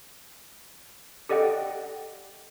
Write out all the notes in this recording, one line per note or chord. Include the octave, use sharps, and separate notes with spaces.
G4 A4 D5 D#5 F#5 G5